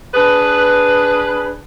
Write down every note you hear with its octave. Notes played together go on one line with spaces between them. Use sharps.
D4 G#4 B4